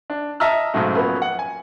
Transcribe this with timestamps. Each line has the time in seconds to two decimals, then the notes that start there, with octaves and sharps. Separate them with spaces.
0.10 D4
0.40 D#5 E5 A5 A#5 E6 F6
0.74 B1 G#2 C#3 F#3 A3
0.95 F3 F#3 A#3 B3 C#4
1.22 F#5
1.39 G#5